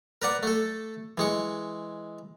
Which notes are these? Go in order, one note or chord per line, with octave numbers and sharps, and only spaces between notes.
A#4 B4 D5 F#5
A3 A4
E3 G#3 C#6